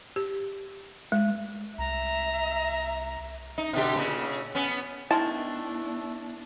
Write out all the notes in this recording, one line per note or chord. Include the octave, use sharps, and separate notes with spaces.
G4
G#3
C2 E5 A#5
D#4
B2 D3 G4
A#2 C#3
B3 C#4
D#3 G#3 A3 B3 D4 E4 A5